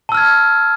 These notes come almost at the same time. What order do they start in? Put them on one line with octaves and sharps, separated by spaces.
A5 E6 F6 G#6